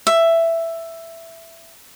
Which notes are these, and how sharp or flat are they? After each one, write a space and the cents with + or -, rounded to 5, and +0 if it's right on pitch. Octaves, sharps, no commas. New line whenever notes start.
E5 +10